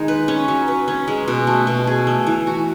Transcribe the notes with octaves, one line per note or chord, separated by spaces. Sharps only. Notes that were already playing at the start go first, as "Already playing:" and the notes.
Already playing: D#3 G#3 D#4
B4
C#4
F#3
B4
C#4
G#3
B2
A3
B2
G#4
A3
E3
F#4